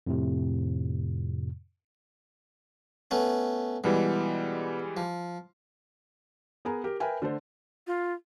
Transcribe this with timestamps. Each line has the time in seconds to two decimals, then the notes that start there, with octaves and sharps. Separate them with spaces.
0.07 F2 A2 C3
3.11 A3 B3 C#4
3.84 B2 E3 G3 G#3
4.97 F3
6.65 B3 G#4 A#4 G#5 A#5
6.84 G4 A#4
7.00 A#4 B4 E5 G5 G#5
7.22 D3 A3 A4 C5
7.87 F4